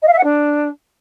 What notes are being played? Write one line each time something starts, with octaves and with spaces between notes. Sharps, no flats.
D#5
F5
E5
F#5
D4